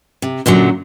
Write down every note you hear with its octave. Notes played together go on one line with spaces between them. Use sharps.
C3
F#2 A#2 D3 F#3